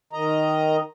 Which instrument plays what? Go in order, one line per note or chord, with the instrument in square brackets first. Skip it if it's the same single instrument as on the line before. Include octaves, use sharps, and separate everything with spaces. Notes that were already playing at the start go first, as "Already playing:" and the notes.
[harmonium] D#3 D#5 A#5